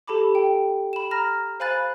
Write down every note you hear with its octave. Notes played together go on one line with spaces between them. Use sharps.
G4 A4 A5 B5 D6
G5
B5 E7
A#5 F6 A#6
C5 F5 G#5 B5 F#6 A6